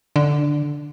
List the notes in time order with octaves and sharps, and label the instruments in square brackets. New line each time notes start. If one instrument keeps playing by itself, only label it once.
[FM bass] D3